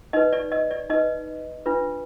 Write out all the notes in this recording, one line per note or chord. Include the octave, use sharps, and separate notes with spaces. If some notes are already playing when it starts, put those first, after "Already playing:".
D#4 B4 D#5
D5
D#5
D5
D#4 B4 D#5
D4 F4 B4